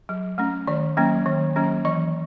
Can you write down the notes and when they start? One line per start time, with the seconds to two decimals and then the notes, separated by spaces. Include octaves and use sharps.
0.09 F#3
0.38 A3 C#4
0.67 D#3 D5
0.97 F#3 A#3 C#4
1.26 D#3
1.56 F#3 A#3 C#4
1.85 E3 D#5